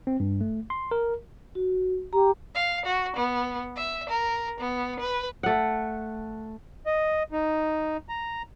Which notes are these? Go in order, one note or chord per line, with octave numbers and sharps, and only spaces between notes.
C4
G2
A3
C6
A#4
F#4
G4 A#5
F5
F#4
B3
E5
A#4
B3
B4
A3 F#5
D#5
D#4
A#5